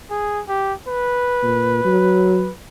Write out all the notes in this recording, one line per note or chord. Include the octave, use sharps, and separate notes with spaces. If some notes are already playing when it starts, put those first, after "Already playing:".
G#4
G4
B4
A#2
F#3